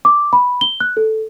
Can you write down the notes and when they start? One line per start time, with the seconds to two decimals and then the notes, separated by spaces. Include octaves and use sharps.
0.05 D6
0.33 B5
0.61 G7
0.80 F#6
0.97 A4